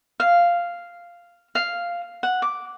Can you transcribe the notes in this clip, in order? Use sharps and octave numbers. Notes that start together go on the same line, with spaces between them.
F5
F5
F#5
D6